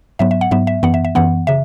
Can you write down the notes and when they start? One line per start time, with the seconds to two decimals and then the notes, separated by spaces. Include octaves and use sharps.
0.19 G#2 F#3 B3 E5
0.31 E5
0.41 F#5
0.51 G#2 F#3 B3 E5
0.67 E5
0.83 F#2 E3 B3 F#5
0.94 E5
1.05 E5
1.15 F#2 E3 B3 F#5
1.47 C#3 E5